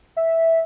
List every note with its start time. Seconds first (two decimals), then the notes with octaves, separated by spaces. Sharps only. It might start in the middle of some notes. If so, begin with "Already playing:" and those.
0.17 E5